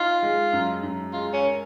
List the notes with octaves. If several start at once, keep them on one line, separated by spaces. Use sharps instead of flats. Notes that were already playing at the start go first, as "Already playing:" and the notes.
Already playing: D#4 F4
G#3
F#2
F#2
G#3 F4
C#4
A#4